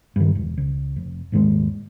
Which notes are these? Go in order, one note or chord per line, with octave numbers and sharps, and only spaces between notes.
G2 D#3
E1
C#2
F1
D#1 G#2 D#3 G#3